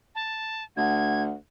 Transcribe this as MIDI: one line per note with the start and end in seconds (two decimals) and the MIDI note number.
0.15 0.64 81
0.77 1.33 38
0.77 1.29 78
0.77 1.23 92